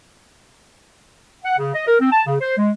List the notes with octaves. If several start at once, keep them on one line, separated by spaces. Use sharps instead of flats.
F#5
C#3
D#5
A#4
C4
A5
C#3
C5
G#3